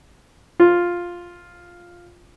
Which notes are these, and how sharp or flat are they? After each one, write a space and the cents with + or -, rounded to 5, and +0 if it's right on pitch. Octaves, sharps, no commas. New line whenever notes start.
F4 +5